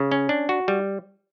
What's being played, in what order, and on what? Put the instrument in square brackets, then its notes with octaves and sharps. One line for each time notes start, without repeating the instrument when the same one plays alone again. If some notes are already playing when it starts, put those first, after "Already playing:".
Already playing: [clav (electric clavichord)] C#3
C#4
D4
F#4
G3